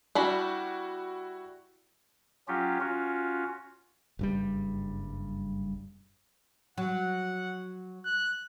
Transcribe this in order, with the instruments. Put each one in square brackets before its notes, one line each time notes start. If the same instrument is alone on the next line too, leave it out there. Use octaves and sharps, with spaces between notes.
[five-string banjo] G3 D4 B5 [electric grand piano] E4 F#4
[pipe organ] F#3 C#4 F4 G4
C#4 F4 F#4
[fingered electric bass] F#1 G2 G3
[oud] F#3 [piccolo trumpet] F#5
[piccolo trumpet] F#6